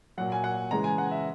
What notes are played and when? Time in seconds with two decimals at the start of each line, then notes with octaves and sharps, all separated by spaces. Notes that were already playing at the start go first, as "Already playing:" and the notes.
0.18 A#2 F#3 F#5
0.32 G#5
0.44 F#5
0.71 C#3 E3 G#3 A#5
0.84 G#5
0.98 F#5
1.11 E5